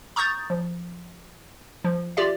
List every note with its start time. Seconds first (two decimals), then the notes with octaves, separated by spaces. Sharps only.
0.16 A#5 C#6 D#6 G6 A6
0.50 F3
1.84 F3
2.17 F4 G4 D5 E5